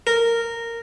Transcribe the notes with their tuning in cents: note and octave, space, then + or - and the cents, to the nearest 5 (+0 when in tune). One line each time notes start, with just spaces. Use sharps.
A#4 -10